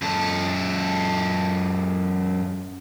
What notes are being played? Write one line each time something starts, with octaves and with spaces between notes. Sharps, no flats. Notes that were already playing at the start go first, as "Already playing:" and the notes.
F#2 A4